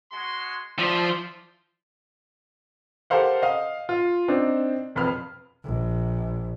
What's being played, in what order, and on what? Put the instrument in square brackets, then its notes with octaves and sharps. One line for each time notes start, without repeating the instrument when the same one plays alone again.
[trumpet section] G#3 F#4 C6
[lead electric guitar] F3 C5 [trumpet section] D5 E5
[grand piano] G4 A4 A#4 C5 F5 F#5
D#5 F5
F4
C4 D4 D#4
E1 F2 B4 B5 F6
[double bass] A#1